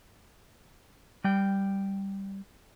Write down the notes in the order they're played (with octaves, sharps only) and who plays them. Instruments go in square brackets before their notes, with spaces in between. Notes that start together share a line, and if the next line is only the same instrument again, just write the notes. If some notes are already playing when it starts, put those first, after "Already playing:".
[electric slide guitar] G3 G5